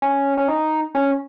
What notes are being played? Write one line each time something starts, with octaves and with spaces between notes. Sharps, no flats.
C#4
C#4
D#4
C#4